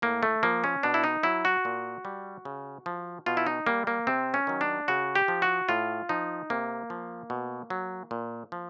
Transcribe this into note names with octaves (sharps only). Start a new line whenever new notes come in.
A2 A#3
A3
F3 A#3
C#4
B2 D4
E4
D#4
F#3 E4
F#4
A#2
G3
C#3
F3
B2 F4
E4
D#4
G3 A#3
A#3
C3 C4
C#4
D#3 F#3
D4
C#3 F#4
G4
F3
F#4
A2 F4
F3 D#4
C3 A#3
F3
B2
F#3
A#2
F3